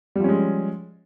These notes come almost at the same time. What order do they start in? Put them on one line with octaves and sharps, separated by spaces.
G3 F3 C#4 G#3